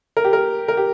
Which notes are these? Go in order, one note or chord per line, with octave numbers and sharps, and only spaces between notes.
A#4
G4
A#4
A#4
G4